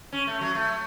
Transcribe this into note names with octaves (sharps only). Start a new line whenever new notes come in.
C#4
A3
F#3
A3